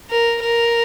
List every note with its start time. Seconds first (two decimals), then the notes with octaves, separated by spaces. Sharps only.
0.10 A#4
0.42 A#4